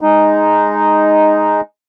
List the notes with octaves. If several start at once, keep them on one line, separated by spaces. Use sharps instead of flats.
G#3 D#4